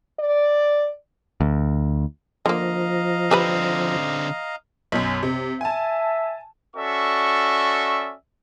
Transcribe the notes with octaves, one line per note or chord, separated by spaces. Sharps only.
D5
D2
D3 F3 A#3 D#5 F5 A#5
D3 C4 G4 B4 B5
B1 F#2
C3
E5 G#5 A5
C#4 F#4 A4 D5 E5 C#6